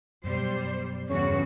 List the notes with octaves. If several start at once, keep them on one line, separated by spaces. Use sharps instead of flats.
F#2 B2 G3 C5
E2 G2 C#3 F#4 C#5